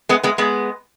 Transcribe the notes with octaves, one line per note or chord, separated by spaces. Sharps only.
G#3 B3
G#3 B3
G#3 B3